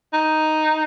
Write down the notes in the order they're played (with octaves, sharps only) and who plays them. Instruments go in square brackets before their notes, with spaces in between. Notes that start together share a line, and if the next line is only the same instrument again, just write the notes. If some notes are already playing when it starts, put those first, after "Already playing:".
[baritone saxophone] D#4